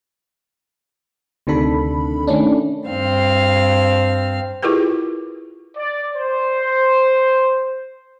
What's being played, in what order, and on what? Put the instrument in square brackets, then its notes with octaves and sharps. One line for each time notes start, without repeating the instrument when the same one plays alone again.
[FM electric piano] D2 C3 D#3 D4 A4 B5
D#3 A3 C#4 D4
[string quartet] G2 C4 F5
[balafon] E4 F4 G4 G#4 A#4 B4
[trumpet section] D5
C5